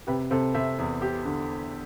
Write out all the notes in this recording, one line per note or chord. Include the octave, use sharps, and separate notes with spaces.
C3 G4 B4
C3 A4 C5
C3 C5 E5
E2
G4
D3